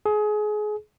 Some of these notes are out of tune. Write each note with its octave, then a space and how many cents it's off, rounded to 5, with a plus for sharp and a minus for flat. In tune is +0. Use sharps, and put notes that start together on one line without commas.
G#4 +25